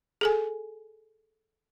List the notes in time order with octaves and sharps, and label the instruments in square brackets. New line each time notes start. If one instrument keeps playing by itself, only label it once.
[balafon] G#4 A4 G#5